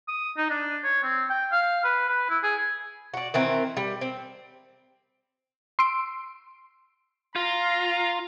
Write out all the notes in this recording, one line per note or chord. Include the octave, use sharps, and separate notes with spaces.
D#6
D#4
D4
C#5
C4
G5
F5
B4
B4
E4
G#4
F#4 D5
D#3 E3 C4 A#4
G3
C4
C6 E6 D7
F4 A#5